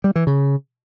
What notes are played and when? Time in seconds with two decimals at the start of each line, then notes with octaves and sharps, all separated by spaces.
0.04 G3
0.16 E3
0.27 C#3